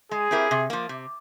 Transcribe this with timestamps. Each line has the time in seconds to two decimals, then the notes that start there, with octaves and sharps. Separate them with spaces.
0.11 G#3 G#4
0.31 C4 E4 G4 A#4
0.51 C3
0.70 F3 A#3
0.89 C3